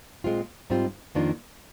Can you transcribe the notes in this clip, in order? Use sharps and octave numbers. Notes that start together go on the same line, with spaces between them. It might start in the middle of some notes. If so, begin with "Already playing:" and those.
A#2 G#3 C4 F4
G#2 G3 C4 F4
F2 D#3 A#3 D4 F4